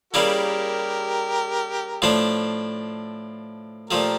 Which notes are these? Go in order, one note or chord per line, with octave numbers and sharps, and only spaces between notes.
C#3 G3 A#3 E4 G4 A#4
A2 F3 A3 D4
A#2 F3 A3 G4 A#4